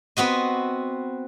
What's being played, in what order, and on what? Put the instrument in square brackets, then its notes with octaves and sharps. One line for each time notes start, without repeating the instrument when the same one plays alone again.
[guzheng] B3 C4 F#4 D#5